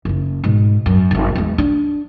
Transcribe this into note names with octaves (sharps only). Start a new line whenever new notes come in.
F#1 E4
G#2 B2
F#2
D#1 G#1
E2 G#3
D4